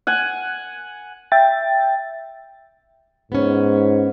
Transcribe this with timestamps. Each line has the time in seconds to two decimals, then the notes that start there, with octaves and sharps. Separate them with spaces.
0.07 F#5 G#5
1.32 E5 G5 A6
3.32 G#2 B3 C#4